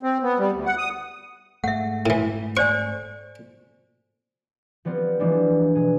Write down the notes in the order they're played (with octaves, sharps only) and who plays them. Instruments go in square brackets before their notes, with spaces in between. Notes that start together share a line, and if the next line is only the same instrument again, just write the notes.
[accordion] C4
B3
G3
D2
F#5
D#6
[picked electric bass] G#2 A3 [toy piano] E5 F#5
[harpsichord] A2 E3
[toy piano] C5 D5 G#5 [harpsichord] C#6
[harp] F3 G3 B3 C4 F4
E3 F3 G3 G#3 B3 D4
B2 G#4